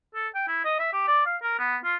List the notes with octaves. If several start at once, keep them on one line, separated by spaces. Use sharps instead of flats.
A4
G5
E4
D#5
E5
G4
D5
F5
A#4
B3
F4